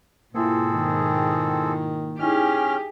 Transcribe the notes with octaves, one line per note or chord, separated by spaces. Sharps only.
G#2 B2 A#3 C4 E4 F4 G#4 A4
D#3
C#4 D#4 E4 G4 G#4 F6